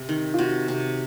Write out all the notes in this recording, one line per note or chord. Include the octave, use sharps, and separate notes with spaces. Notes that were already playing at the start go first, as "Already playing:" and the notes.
Already playing: C3
D#3
F4
C3 F#4
C3